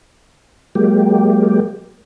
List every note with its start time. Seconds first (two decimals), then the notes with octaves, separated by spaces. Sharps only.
0.75 F#3 G#3 A#3 G4